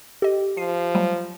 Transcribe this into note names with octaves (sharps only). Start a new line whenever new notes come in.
G4 A4 D#5
F3 C7 D#7
F#3 G3 A3